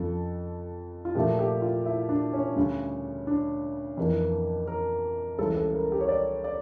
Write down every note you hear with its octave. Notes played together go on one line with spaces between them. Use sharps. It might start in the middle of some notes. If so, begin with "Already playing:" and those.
Already playing: F2 C#3 F3 A4
F4
A#2 F3 A3 G4
G4
F4
E4
D4
C#4
D2 C#3 G3
D4
F2 E3 A#3
A#4
C#2 C#3 E3 G3 A4
A4
A#4
G4
C#5
D5
D5